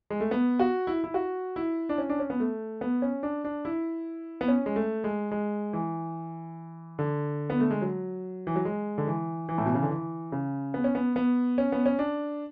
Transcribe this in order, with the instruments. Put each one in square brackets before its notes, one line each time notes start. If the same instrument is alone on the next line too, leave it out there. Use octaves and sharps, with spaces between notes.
[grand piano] G#3
A3
B3
F#4
E4
E4
F#4
E4
D4
C#4
D4
C#4
B3
A3
B3
C#4
D4
D4
E4
B3
C#4
G#3
A3
G#3
G#3
E3
D3
B3
A3
G#3
F#3
E3
F#3
G#3
D3
E3
E3
A2
B2
C#3
D3
E3
C#3
B3
C#4
B3
B3
C#4
B3
C#4
D4